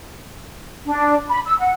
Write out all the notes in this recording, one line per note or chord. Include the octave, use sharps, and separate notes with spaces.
D4
B5
E6
F#5